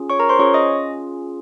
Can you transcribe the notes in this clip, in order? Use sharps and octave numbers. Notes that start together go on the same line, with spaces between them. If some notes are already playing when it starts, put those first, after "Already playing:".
Already playing: C#4 F4 G#4
C#5 C#6
A#4 A#5
C5 C6
C#4 F4 G#4 C#5 C#6
D#5 D#6